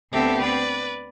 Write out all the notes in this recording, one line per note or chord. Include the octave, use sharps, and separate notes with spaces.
D2 B3 C4 G4 A4 E5
B4 D5